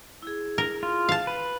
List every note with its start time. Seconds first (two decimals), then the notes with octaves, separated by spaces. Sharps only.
0.23 E4 G#4
0.58 A#4
0.83 F4
1.09 F5 A5
1.27 B4